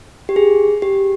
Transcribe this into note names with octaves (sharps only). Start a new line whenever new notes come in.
G4
G#4
G4